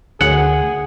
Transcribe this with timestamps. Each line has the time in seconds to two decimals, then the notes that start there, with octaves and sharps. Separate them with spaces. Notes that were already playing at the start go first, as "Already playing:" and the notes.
0.21 D2 G#4 F#5